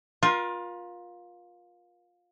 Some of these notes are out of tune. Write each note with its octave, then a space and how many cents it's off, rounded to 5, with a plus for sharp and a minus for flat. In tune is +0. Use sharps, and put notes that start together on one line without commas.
F4 +20 A#4 +40